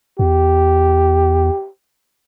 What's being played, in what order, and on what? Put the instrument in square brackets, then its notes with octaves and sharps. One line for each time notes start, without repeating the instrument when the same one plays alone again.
[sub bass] E2 [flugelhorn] G4